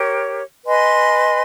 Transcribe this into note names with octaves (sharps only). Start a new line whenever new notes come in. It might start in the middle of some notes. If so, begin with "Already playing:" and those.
Already playing: G4 A#4 C#5
B4 D#5 G#5 C6